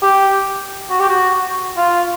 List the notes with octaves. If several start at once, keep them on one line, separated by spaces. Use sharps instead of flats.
G4
F#4
G4
F#4
F4